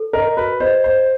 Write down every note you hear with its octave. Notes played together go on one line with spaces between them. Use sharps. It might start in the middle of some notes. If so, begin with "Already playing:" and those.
Already playing: A4
A#4 D#5
F#4 B4
C5 D#5
C5 D#5